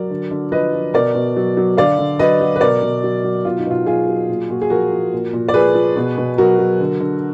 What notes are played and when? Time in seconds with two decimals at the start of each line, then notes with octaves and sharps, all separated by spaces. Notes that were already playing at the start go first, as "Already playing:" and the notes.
Already playing: F#3 A#4 D5
0.10 D3
0.31 D3
0.52 F3 B4 D#5
0.73 F3
0.94 B2 A#4 D5
1.15 B2
1.36 F#3
1.57 F#3
1.77 D3 D5 F5
1.98 D3
2.19 F#3 B4 D#5
2.41 F#3
2.56 B4
2.61 B2 A#4 D5
2.82 B2
3.04 F#3
3.24 F#3
3.45 B2 F4
3.58 D#4
3.66 B2 F4
3.86 F#3 F4 G#4
4.08 F#3
4.29 A#2
4.50 A#2 F#4
4.61 G#4
4.70 F3 F#4 A#4
4.91 F3
5.13 A#2
5.33 A#2
5.48 D5
5.54 F3 G#4 B4
5.75 F3
5.96 B2
6.18 B2
6.38 F#3 F#4 A#4
6.59 F#3
6.80 D3
7.00 D3